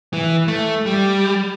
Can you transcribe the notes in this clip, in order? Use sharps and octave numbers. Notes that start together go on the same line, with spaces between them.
E3
A3
G3